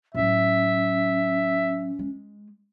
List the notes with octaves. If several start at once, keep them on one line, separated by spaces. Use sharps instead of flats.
A2 F#3 C#4 E5
G#3